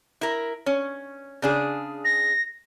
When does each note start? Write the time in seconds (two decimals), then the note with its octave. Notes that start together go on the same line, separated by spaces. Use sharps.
0.21 E4 A#4
0.66 C#4
1.42 C#3 D4 G#4
2.05 A#6